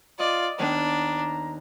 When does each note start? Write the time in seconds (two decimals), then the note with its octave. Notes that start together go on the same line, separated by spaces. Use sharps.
0.19 F4 D5 D#5
0.59 D#2 B3 D4 A#5